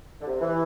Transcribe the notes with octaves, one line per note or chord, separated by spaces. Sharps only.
D3
C3
E3